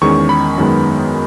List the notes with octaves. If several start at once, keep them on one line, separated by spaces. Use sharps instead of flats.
E2 D#3 G#3 C#4 C#6
B5
F#2 D#3 G#3 B3